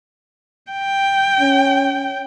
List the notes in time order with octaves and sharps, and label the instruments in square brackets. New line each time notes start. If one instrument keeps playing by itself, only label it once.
[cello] G5
[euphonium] C#4